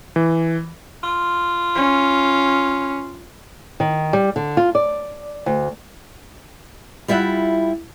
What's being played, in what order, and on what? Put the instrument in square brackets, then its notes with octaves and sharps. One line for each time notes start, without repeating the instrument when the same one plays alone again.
[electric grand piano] E3
[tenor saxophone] F4
[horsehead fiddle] C#4
[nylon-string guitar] D#3
G3
D3
F4
D5
D2
G3 E4 F4 D5 E5 F#5